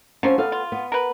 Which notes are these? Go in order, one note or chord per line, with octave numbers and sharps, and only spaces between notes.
F3 F#3 C#4 C5
B3 A4 F5
F4
B3
A#4 B4